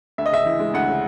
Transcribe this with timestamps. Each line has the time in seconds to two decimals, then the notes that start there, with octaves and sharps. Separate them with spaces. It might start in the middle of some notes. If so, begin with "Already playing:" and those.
0.18 D2 E5
0.26 D#5
0.32 C#3 E5
0.46 E3
0.59 G#3
0.74 D2 F#5
0.88 C#3